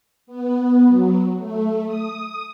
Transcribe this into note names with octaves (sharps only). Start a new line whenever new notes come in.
B3
F#3
A3
D#6